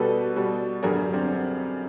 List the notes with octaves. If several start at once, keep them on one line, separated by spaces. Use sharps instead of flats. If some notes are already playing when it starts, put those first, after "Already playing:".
Already playing: B2 G3 A4 B4
B2 G3
F#2 D3 G3 G#4 A#4
C4 D4